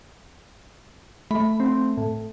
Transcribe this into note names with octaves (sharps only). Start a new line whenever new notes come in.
A3 B5
C4
A2